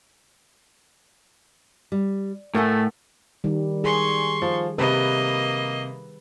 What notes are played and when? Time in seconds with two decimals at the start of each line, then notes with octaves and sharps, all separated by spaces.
1.92 G3
2.54 A2 A3 A#4 F#5 G#5
3.44 D#3 G3
3.84 G#4 C6 C#6
4.42 F3
4.78 C3 A#3 B4 D#5